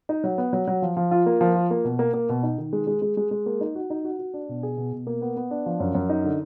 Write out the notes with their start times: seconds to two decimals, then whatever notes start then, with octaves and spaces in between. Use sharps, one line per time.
0.09 D#4
0.24 F#3
0.38 B3
0.53 F#3
0.67 F#3
0.82 F3
0.97 F3
1.11 F4
1.26 A#3
1.41 F3
1.55 F4
1.71 A#3
1.84 B2
1.99 A#3
2.14 A#3
2.29 B2
2.43 D#4
2.58 D#3
2.73 G#3
2.87 G#3
3.02 G#3
3.17 G#3
3.31 G#3
3.46 A#3
3.61 D#4
3.75 F#4
3.90 D#4
4.05 F#4
4.19 F#4
4.34 D4
4.49 B2
4.63 G#4
4.77 B2
4.92 B2
5.07 A#3
5.22 B3
5.36 B3
5.51 D4
5.66 F3
5.80 F#2
5.95 F#2
6.09 D#4
6.24 D3